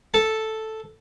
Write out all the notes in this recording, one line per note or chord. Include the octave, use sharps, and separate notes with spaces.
A4 A5